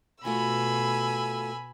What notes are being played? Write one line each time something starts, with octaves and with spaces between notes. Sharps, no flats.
B2 A3 F4 F#4 G#5 B5 E6